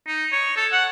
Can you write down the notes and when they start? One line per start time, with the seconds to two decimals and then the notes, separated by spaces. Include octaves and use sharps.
0.07 D#4
0.32 C#5
0.57 A4
0.72 F#5